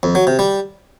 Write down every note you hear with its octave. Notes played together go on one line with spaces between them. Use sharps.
F2
F#3
C3
G3